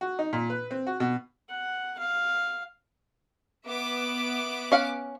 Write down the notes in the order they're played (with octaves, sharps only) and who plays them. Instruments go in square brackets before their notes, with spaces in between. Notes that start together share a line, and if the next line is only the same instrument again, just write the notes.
[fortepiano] F#4
D#4
A#2
B4
C4
F#4
B2
[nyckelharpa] F#5
F5
[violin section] B3 E5 D6
[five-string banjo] C#4 F5 F#5